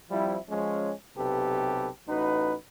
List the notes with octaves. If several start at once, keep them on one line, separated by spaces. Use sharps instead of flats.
F3 G3 C4 E4
F3 G#3 C#4
B1 C3 G4 A4 B4
A1 D#4 F#4 B4